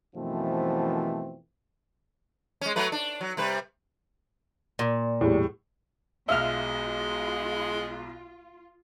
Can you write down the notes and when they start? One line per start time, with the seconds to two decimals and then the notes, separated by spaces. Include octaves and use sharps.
0.16 F#2 B2 E3 F3 A3 C4
2.61 G#3 C#4
2.76 F#3 A3 B4
2.92 D4
3.21 F#3
3.37 C3 G3 B4
4.79 A#2
5.21 E2 A2 G3
6.29 B1 B2 G#3 F4 E5 F5 D#6 F6